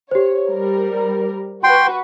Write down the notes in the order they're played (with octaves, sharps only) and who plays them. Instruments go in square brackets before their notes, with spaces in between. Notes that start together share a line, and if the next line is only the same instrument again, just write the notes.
[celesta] G4 C5 [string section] C#5
[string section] G3 A#4
[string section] F#4 B4 [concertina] G5 C6